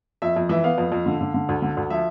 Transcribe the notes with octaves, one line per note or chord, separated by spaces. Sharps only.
F2 E5
F2
E3 E5
B3 F5
F2
F2
D3
D3
D3
D2
D3
D2
F3 E5